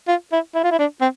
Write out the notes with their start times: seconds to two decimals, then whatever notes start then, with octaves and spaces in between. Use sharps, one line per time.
0.08 F4
0.32 E4
0.55 E4
0.64 F4
0.71 E4
0.79 D4
1.01 C4